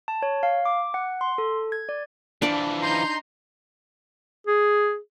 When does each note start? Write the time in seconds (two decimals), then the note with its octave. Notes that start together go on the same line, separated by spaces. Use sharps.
0.08 A5
0.22 C#5
0.43 F5
0.65 D6
0.94 F#5
1.21 C6
1.38 A4
1.72 G#6
1.89 D5
2.42 E3 F3 D4 D5 A5
2.82 D#4 A#5 C6 G6
4.47 G#4